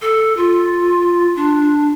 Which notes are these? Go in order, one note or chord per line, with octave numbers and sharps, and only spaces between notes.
A4
F4
D4